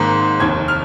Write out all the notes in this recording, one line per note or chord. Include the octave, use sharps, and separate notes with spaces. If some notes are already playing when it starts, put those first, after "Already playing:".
Already playing: G#1 G#2 D#3 A#3
F1 D#2 D#3 G#6
F6